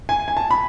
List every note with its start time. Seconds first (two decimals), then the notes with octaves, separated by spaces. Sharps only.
0.09 G#5
0.28 G#5
0.37 A5
0.51 B5